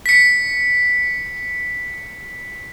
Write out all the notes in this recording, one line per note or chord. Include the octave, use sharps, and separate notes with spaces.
B6 C#7